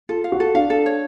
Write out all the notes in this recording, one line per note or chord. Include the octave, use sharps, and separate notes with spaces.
F4 A4
F5
F#4
A4
D4 F5
A4
C#5